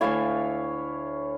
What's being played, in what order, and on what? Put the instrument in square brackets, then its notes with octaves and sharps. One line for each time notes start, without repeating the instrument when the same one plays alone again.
[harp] D2 A4 G#5 [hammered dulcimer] E4 C#5 F5